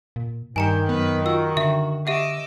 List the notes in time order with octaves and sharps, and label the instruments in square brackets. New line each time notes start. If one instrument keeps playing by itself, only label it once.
[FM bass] A#2
[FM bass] G2 [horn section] D#3 [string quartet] G3 G4 [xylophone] G#5 A#5 C#7
[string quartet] F#2 B4 [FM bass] B3
[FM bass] F4 [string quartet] F#4 [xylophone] E6
[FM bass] D3 [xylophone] E5
[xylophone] G4 E5 F#5 [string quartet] D#5 D6 E6